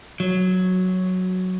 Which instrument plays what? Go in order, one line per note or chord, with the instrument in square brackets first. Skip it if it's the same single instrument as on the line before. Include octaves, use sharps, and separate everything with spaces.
[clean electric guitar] F#3